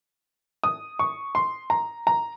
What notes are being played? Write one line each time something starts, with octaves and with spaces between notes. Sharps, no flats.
D#6
C#6
C6
A#5
A#5